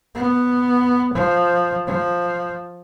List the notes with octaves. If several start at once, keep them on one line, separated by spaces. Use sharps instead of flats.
B3
F3
F3